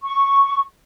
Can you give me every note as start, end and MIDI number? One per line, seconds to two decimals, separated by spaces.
0.01 0.60 85